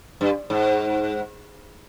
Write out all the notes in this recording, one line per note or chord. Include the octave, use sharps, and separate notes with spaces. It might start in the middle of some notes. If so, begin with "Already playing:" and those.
G2
G#2